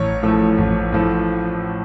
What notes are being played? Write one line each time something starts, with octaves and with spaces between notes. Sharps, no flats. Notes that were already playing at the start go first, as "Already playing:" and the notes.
Already playing: A1 C#5
A2 F3 A3
A1
A2 F3 A3